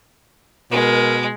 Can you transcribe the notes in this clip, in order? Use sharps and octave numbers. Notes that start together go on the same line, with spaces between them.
B2 G#3 A#4